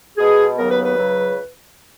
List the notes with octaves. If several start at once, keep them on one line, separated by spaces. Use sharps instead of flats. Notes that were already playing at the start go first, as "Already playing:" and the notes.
B2 G#3 B3 G#4
D#2 C#3 F#3 B3 A#4
B4
B4
C#2 C#3 F#3